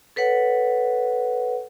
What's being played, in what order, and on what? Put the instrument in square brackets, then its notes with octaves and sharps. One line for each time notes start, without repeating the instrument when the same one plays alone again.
[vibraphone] A4 B4 C#5 F#5